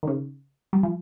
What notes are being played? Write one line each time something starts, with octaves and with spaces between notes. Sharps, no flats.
D#3
C#3
G3
F3